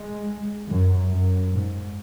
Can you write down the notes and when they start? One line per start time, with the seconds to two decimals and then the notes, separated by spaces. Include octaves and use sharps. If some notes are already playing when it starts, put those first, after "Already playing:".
Already playing: G#3
0.68 F#2
1.11 F#2
1.53 G#2